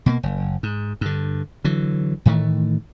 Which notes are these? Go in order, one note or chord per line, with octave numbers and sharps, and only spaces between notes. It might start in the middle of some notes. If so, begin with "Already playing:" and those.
B2 A3 A#3
F#1
G#2
G2 D3
D3 E3 F#3
A2 D#3 E3 A3